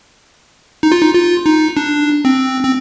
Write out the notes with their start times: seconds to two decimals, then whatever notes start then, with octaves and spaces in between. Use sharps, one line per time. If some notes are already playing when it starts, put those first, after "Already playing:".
0.83 D#4
0.92 F4
1.01 D#4
1.14 F4
1.46 D#4
1.77 D4
2.25 C4
2.65 C4